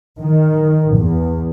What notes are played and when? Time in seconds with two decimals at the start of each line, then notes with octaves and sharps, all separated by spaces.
0.19 D#3
0.95 E2